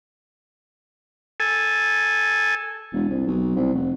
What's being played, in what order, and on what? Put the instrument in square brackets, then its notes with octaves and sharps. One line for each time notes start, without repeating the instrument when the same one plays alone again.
[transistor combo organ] A4 G#5
[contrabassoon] E1
C2
B1
C2
F1